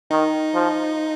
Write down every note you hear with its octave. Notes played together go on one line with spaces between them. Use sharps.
D#3 D#4
F3